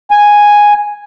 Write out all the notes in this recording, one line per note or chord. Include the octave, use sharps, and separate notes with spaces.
G#5